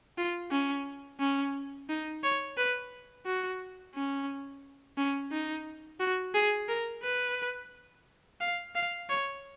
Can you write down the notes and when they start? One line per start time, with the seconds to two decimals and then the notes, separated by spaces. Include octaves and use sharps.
0.18 F4
0.51 C#4
1.20 C#4
1.89 D#4
2.23 C#5
2.57 B4
3.26 F#4
3.95 C#4
4.98 C#4
5.32 D#4
6.00 F#4
6.34 G#4
6.69 A#4
7.03 B4
8.41 F5
8.75 F5
9.09 C#5